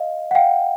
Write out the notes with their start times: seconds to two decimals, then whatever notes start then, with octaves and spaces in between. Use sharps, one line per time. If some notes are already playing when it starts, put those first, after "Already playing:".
Already playing: D#5 F5
0.31 F#5
0.35 F5 G5